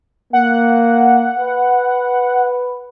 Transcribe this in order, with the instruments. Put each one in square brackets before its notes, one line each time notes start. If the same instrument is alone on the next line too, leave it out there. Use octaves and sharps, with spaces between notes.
[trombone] A#3 [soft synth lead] F#5
[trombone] B4